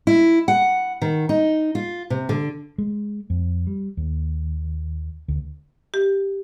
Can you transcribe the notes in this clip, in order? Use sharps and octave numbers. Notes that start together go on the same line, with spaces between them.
E4
F#5
D#3
D#4
F4
C3
D3
G#3
F2
G3
D#2
D2
G4